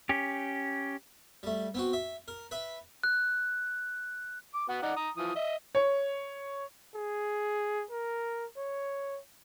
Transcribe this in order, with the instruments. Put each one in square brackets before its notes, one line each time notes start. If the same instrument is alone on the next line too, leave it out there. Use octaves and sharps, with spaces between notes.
[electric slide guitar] C#4 G4
[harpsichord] G3 A3
B3 C4 F#4
E5
A#4
B4 E5
[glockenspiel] F#6
[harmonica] D6
B3 F#4 F#5
D#4 D5 F#5
A#5 D#6
E3 F3 D#6
D#5 E5
[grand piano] C#5
[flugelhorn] G#4
A#4
C#5